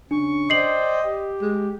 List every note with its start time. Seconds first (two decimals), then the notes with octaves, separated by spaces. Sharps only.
0.11 C#3 D4 C#6
0.50 C5 D5 D#5 G5 C7 F#7
1.03 G4
1.41 G#3